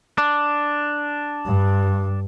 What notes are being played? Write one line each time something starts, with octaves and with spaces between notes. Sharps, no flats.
D4
G2